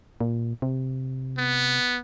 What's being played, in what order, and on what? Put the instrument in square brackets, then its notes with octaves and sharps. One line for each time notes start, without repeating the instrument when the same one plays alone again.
[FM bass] A#2
C3
[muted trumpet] B3